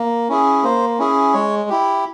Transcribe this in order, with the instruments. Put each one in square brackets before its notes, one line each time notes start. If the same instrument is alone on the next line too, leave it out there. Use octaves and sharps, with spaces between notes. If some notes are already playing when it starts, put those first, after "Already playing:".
Already playing: [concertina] A#3
C#4 E4 G#4
A#3 C5
C#4 E4 G#4
G#3 C#5
E4 G4